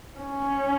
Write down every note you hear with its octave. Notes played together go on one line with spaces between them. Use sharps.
C#4